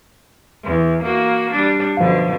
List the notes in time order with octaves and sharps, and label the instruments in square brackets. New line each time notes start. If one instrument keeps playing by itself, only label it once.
[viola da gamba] E2
A#3 F#4
G3 D4
[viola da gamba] F#2 B2 D3 [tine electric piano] F3 F5